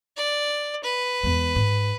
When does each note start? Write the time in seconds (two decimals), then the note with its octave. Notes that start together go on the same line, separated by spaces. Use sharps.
0.17 D5
0.84 B4
1.23 E2 G#3
1.56 G#2